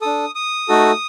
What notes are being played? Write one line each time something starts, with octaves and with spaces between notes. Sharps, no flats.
D4 A4 D#6
D#6
A3 D#4 F#4 A4